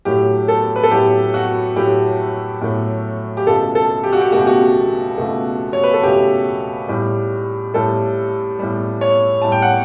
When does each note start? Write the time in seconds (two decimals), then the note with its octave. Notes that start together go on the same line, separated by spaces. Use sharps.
0.05 A2 F#3 A3 G4
0.48 A4
0.76 B4
0.83 A4
0.91 A2 F#3 A3 G4
1.34 F#4
1.76 A2 F#3 A3 G4
2.61 A2 F#3 A3
3.37 G4
3.47 C#2 B2 A3 A4
3.75 A4
4.04 G4
4.13 F#4
4.21 G4
4.32 C#2 B2 A3 F#4
4.40 G4
4.47 F#4
5.18 C#2 B2 A3
5.73 C#5
5.84 B4
5.93 A4
6.03 C#2 B2 A3 G4
6.88 A2 G3
7.74 A2 G3 A4
8.59 A2 G3
9.01 C#5
9.42 A2 G3 A5
9.52 G5
9.62 F#5